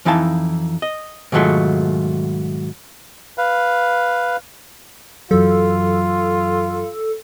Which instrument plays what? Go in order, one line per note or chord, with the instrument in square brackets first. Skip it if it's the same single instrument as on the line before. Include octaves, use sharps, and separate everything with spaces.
[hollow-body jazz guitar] F2 E3 D#4 E4 F5 A5
D#5
G#2 B2 D#3 F#3 A3 F4
[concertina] B4 F5
[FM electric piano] F#2 E3 F#3 [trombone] F4 [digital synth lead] A4